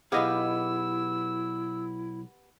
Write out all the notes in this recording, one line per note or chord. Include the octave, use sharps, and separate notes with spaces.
B1 B3 E4 G4 G#4 D#5 F5 E6